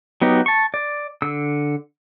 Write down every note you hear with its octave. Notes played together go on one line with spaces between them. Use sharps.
F#3 B3 D#4 G4
A5 C#6
D5
D3 E6